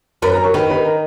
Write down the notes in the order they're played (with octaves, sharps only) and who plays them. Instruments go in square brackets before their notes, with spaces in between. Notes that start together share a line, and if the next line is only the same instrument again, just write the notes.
[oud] F#2 [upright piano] B4 B5
[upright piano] A#4 A#5
C#5 C#6
[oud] D#3 [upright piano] B4 B5
[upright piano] B4 B5
A#4 A#5